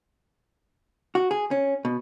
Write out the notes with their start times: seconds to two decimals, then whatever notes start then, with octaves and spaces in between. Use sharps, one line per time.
1.15 F#4
1.31 G#4
1.51 C#4
1.85 B2